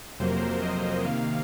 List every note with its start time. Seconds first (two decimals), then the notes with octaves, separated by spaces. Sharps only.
0.20 F2 C3 F#3 A#3 C5
0.28 A#4
0.36 C5
0.62 D#5
1.05 C3 D#3 A#3 F5